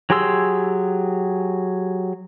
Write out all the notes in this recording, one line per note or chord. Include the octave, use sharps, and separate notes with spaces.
F#3 G4 G#4 C6 E6